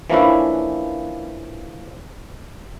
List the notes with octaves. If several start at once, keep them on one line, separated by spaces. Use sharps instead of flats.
E3 F3 A#3 C#4 D4 E4